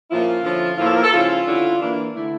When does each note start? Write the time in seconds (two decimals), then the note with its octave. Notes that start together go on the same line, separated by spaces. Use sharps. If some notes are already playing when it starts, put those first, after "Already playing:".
0.09 A#2 F3 C#4 E4 F4
0.43 D3 F3 C#4 E4
0.77 A2 F3 A#3 E4 F4
0.86 A4
0.95 A#4
1.03 A4
1.12 C#3 F3 C#4 E4 F4
1.46 D3 G3 C#4 E4
1.80 E3 A#3 D4
2.14 D3 A3 E4